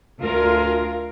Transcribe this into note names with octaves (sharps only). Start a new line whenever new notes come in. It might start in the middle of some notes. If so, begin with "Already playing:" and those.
D2 F4 A#4